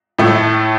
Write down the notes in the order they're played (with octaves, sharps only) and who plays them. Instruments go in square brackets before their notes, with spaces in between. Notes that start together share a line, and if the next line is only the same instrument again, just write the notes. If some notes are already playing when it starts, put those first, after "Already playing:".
[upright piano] A2 A3